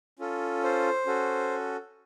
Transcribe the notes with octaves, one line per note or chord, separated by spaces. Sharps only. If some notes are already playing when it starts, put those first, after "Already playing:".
C#4 F4 A4
C5
C#4 F#4 A4